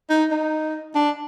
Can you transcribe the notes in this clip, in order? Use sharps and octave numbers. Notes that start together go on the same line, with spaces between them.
D#4
D#4
D4